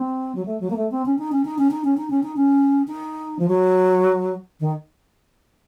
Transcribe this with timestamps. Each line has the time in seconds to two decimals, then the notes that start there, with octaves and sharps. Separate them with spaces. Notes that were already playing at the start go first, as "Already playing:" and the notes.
Already playing: C4
0.35 F#3
0.45 A3
0.60 F#3
0.70 A#3
0.76 A3
0.91 C4
1.06 C#4
1.19 D#4
1.32 C#4
1.45 D#4
1.58 C#4
1.71 D#4
1.84 C#4
1.97 D#4
2.10 C#4
2.23 D#4
2.36 C#4
2.88 D#4
3.39 F3
3.48 F#3
4.60 D#3